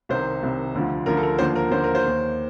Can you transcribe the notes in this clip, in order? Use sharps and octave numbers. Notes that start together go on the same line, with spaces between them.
C2 C3 D#3 C5
C2 C3 D#3
D2 D3 F3
D2 D3 F3 A#4
A4
A#4
D#2 D3 F3 C5
A#4
D#2 D3 F3 C5
A#4
C5
D#2 D#3